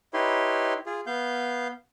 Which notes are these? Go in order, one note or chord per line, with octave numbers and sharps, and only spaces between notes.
D#4 E4 G4 B4 C#5 C6
F4 G#4
B3 F5 G6